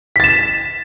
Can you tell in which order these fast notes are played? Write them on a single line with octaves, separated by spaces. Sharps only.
B6 A6 E7